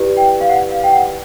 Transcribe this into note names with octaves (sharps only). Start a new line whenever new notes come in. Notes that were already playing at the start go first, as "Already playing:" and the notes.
Already playing: E4 G4 B4 D5
G5
F5
F#5
F5
G5
F#5